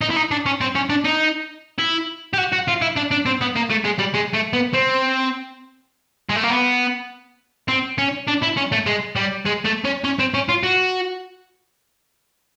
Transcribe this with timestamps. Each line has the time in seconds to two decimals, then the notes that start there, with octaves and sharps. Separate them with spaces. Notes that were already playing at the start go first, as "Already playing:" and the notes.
0.01 D#4
0.10 E4
0.16 D#4
0.31 D4
0.46 C#4
0.61 C4
0.75 C#4
0.90 D4
1.05 D#4
1.78 E4
2.33 G4
2.38 F#4
2.52 F#4
2.68 F4
2.82 E4
2.96 D4
3.11 D4
3.26 C4
3.41 B3
3.56 A#3
3.70 A3
3.85 G#3
3.99 G3
4.15 G#3
4.34 A3
4.54 B3
4.74 C4
6.30 G#3
6.36 A3
6.43 A#3
6.50 B3
7.68 C4
7.98 C#4
8.27 D4
8.42 E4
8.57 C#4
8.72 A3
8.86 G#3
9.16 G3
9.46 G#3
9.65 A3
9.85 C#4
10.04 C#4
10.19 C4
10.34 C#4
10.49 F4
10.63 F#4